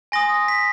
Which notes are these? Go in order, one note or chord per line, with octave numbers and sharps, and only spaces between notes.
G#5 C6 D#6 A#6
B6